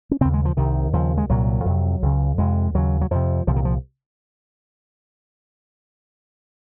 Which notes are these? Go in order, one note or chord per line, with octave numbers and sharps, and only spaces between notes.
C#4
D#2 C#3 C4
G#3
F3
C2 C3 D#3
D#2 C#3 F3
G#3
C2 A#2 F#3
F2 C3
C#2 C#3
F2 C3 G#3
D#2 C#3 F#3
F#3
F2 C3 F3
C2 A#2 F3
D#3
F3